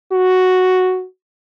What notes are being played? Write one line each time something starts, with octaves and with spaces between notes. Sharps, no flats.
F#4